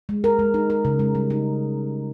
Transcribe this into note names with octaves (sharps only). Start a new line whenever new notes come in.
G#3
A#4
G#3
D#4
A#4
C#3
G#3
G3
D#4